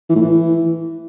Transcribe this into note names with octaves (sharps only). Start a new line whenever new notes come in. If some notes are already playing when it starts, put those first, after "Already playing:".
E3
A2
E3